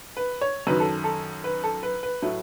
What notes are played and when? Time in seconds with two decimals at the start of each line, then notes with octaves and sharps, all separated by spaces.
0.17 B4
0.41 C#5
0.67 F#2 D#3 F#3 B4
0.80 A4
1.04 A4
1.44 B4
1.64 A4
1.83 B4
2.03 B4
2.22 A2 F#3 A3